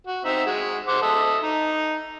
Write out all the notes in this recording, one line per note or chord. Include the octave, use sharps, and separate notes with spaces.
F#4
C4 D#4 E5
G#3 F#4
C5 F#5 D6
A4 D#5 E5
D#4